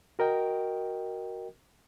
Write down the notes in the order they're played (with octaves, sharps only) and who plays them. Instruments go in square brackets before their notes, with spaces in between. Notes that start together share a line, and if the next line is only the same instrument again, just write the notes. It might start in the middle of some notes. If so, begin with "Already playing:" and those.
[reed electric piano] F#4 A#4 D#5 G5